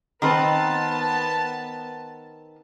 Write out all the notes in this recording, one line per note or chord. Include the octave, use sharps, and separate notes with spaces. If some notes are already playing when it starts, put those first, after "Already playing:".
D#3 B3 C4 B4 A5